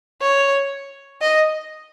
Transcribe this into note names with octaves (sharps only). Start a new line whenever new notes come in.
C#5
D#5